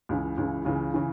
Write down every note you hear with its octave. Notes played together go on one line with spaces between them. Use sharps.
C#2 C#3 E3
C#2 C#3 E3
C#2 C#3 E3
C#3 E3